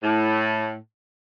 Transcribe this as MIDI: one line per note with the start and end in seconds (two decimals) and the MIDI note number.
0.03 0.76 45